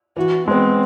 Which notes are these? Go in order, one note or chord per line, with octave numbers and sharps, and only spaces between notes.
E3 F#4
G#3 B3 C4